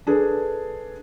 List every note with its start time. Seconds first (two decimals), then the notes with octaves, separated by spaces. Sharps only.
0.07 D4 G#4 A4 B4